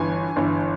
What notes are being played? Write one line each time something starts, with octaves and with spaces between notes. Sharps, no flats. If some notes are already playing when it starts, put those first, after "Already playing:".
Already playing: G1 G2 E3 G#5
G1 G2 E3